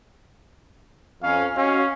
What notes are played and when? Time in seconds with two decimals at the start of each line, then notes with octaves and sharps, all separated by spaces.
1.23 F2 C#4 F5
1.57 C#4 F#4 D#5 F5